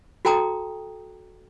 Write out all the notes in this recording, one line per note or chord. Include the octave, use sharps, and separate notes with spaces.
F#4 A4 G5 A5 A#5 D#6